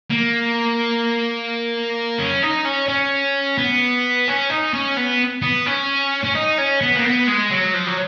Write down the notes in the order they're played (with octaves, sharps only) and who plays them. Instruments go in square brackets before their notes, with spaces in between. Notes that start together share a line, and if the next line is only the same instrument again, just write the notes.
[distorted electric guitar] A#3
C#4
D#4
C#4
C#4
B3
C#4
D#4
C#4
B3
B3
C#4
C#4
D#4
C#4
B3
A#3
B3
G#3
F#3
F3
F#3